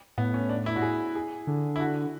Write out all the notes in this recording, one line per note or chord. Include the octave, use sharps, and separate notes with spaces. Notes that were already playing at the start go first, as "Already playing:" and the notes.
A2 B3
C#4
D4
E4
F#4
G#4
G#4
D3
E4
F#4